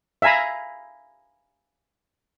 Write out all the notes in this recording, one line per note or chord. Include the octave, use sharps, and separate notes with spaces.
E5 F5 G#5 A#5 B5